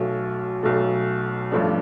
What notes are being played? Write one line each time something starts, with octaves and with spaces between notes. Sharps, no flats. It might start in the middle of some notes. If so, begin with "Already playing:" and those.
Already playing: B1 B2 A3
B1 B2 A3
A1 G2 F3 A3 D4